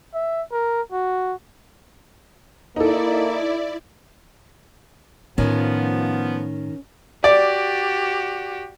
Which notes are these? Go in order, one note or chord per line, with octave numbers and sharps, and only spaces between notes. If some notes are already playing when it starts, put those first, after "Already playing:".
E5
A#4
F#4
A#3 D#4 E4 A4 D5
A2 D#3 F3 B3 C#4
F#4 G4 D5